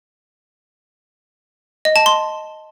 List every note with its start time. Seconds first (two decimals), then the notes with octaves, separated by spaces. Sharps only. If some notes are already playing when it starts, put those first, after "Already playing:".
1.85 D#5
1.96 A5
2.06 C6